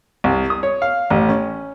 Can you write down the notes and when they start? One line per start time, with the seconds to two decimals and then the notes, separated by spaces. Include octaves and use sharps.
0.24 C2
0.50 D#6
0.63 C#5
0.82 F5
1.10 A1
1.29 C#4